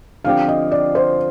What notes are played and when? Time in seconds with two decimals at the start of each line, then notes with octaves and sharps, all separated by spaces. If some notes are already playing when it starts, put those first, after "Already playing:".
0.24 D3 F3 C4 G4 F5
0.48 D#5
0.72 D5
0.95 C5